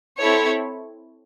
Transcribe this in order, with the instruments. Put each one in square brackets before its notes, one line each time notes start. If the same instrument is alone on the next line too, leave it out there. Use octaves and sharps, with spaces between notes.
[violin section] C4 E4 A4 C#5